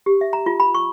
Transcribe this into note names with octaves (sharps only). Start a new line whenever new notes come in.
G4
E5
A#5
F4
B5
C#6